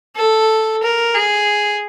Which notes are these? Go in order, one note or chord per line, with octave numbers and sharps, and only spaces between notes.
A4
A#4
G#4